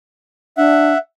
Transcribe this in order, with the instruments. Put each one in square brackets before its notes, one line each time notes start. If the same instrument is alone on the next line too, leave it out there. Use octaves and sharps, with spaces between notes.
[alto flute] D4 [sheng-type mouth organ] E5 F#5